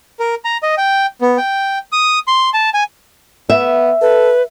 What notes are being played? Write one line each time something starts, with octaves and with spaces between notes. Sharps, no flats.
A#4
A#5
D#5
G5
B3
G5
D#6
C6
A5
G#5
B3 E5
A4 B4